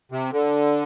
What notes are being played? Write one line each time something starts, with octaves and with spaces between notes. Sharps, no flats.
C3
D3